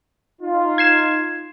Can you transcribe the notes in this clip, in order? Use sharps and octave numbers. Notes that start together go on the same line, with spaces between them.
D#4 F4
G#6 C7 E7